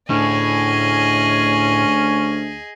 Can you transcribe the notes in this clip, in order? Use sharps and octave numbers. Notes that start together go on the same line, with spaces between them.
D2 A2 C#4 G#4 D#5